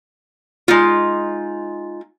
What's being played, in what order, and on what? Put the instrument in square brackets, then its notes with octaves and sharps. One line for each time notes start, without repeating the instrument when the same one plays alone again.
[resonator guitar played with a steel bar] G#3 D#4 F4